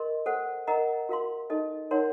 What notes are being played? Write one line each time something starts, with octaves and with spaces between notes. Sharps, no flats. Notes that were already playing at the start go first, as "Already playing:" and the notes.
Already playing: A#4 D#5 C6
A4 C5 F#5
A#4 D#5 F#5 A#5
F#4 A#4 F5 C6
D#4 A4 D#5
D#4 A#4 C#5 F#5 C6